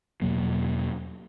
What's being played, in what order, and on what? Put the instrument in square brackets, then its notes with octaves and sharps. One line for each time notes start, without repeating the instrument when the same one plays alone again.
[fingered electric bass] E2 B2 F#3 A#3